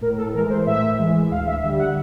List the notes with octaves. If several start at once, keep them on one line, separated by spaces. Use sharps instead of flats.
A2 A#4
A4
E3 G#3 A#4
C5
A2 E5
E3 G#3
D2 F5
E5
D3 G3 E5
F#5